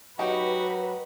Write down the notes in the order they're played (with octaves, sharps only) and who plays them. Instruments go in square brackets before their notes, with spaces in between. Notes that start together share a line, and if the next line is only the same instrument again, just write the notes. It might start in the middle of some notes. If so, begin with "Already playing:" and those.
[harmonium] F#3 [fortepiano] D#4 G4 [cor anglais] F#4 [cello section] B4